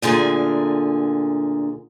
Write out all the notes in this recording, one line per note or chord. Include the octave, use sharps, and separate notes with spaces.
D2 A#2 D3 G#4 A#4